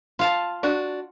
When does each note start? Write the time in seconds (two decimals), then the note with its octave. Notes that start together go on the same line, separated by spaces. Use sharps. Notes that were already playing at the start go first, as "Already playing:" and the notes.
0.19 F4 F5 A5
0.63 D4 F#4